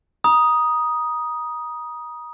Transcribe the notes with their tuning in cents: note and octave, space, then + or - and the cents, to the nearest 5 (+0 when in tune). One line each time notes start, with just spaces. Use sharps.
A#5 +35 D#6 +0